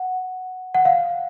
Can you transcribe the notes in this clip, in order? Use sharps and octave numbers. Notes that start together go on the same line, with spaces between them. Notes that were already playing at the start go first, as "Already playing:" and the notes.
Already playing: F#5
F#5
F5